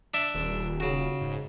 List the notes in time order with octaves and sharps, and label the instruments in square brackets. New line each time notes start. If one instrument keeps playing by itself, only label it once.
[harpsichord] D4 D5 E5
[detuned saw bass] D#1
[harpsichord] C#3 F#4
[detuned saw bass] G#2